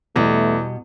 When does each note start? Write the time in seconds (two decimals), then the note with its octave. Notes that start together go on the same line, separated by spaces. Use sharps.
0.16 E2 B2 G3 A3